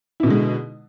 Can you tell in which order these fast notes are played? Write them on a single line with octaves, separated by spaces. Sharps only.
E4 B2 D3 G#3